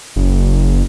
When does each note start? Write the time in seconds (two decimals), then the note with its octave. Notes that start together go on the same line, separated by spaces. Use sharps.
0.16 F#1